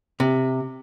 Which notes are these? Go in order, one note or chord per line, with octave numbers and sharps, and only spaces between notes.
C3